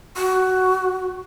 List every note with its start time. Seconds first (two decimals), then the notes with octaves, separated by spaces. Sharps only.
0.17 F#4